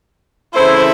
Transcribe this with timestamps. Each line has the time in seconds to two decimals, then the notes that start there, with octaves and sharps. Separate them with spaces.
0.54 C#3 E3 A3 C4 E4 C5